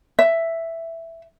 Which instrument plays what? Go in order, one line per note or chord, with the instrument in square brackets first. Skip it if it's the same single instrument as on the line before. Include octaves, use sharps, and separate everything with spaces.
[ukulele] E5